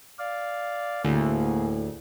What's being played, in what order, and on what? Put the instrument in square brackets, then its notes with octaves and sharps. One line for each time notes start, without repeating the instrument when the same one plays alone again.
[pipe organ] D5 F5
[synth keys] D2 [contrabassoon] A2 [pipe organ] A#3 G#4